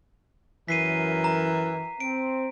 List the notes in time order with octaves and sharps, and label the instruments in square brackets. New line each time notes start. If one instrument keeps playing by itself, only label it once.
[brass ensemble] F#2 A#4 [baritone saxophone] E3 [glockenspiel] B6 C7 D#7
[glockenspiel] A#5
[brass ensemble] C4 [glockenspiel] D7